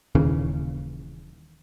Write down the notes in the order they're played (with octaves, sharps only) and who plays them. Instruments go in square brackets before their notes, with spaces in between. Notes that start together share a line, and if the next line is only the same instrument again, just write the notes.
[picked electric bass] D#1 D#2 C#3 E3